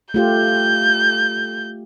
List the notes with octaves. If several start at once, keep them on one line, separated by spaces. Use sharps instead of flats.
A3 F4 G4 G6